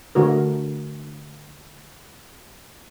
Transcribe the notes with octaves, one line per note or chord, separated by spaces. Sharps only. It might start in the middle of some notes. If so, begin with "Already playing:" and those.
D3 A3 F#4 A#4